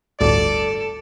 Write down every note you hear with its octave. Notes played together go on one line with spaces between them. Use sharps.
G1 D2 A2 A4 D5